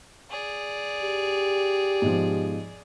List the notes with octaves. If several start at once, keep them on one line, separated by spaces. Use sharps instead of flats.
G#4 D5
G4
G#2 B2 F3